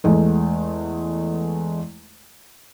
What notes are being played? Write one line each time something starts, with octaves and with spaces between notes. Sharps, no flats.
E2 G#3 A3